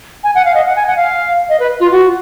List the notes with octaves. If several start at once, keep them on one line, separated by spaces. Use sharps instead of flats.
G#5
F#5
F5
D#5
F#5
G#5
F#5
F5
D#5
B4
F4
F#4